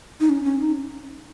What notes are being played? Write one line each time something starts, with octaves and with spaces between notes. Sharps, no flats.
D#4
C#4
C#4
D#4